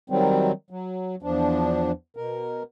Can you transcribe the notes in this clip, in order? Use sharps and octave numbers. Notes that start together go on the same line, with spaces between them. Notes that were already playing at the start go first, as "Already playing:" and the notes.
D#3 F#3 G3 C4
F#3
E2 F3 D4
B2 A#4